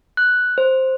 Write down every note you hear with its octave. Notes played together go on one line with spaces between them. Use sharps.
F#6
C5